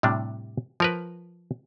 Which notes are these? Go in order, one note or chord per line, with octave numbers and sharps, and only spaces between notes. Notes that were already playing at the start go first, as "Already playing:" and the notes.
A2 C3 G3 D4
F3 A#4 B4